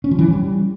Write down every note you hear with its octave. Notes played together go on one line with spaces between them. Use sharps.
C#4
F3
E3
C#4
G3